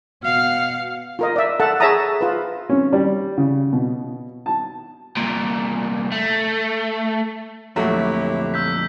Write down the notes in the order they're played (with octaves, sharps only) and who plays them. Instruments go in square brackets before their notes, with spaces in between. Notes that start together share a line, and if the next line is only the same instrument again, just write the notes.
[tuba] B2 [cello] F5 F#5 [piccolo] F6
[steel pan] F4 A#4 D#5
D5 E5
A4 E5 F#5 A5
G#4 C#5 E5 A5 A#5 D#6
F4 B4
[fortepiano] C#4
G3
C#3
B2
A5
[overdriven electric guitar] C2 A#2
A3
[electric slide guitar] F2 A#2 [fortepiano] F#3 A3 F#4 [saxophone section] E4 G4 C#5
[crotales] E6 G6 B6